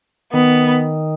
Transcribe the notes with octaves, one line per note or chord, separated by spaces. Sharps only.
D#3 B3